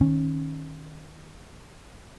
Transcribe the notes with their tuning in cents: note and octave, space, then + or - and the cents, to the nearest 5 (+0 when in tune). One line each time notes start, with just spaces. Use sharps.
D#3 -5 C#4 -20